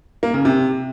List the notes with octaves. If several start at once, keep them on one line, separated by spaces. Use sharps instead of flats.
A#3
C#3
C3